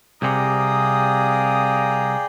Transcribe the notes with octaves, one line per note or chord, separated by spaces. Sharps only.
C2 C3 G#4 D5 F5 G5 A#5 D#6